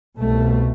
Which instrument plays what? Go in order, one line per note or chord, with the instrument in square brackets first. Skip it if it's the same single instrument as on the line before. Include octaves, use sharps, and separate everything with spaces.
[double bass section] C2 B2 A3